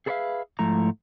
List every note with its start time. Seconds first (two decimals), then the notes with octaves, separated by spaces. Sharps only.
0.06 G#4 A4 B4 C#5 E5 F5
0.59 G#2 F3 A3 E4 A#5